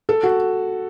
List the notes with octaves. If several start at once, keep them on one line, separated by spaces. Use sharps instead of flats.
A4
F#4